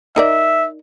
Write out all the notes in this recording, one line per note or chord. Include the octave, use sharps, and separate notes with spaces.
D#4 A#4 D5 E5